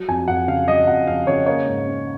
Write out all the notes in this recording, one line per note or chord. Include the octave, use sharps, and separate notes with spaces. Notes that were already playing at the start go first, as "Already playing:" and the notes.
Already playing: F#3
F2 G#5
F2 F#5
C#3 F5
F#3 D#5
F2 F#5
F2 F5
C#3 C#5
A#3 C#5
G#2
C#4